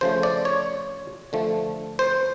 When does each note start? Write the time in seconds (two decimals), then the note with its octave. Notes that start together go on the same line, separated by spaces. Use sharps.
0.01 C#3 F3 A3 C5
0.23 D5
0.45 C#5
1.33 D3 F3 A3
1.99 C5